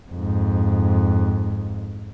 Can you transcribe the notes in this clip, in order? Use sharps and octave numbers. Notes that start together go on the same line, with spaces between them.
F2 G#2